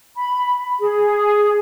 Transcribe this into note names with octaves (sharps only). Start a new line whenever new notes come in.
B5
G#4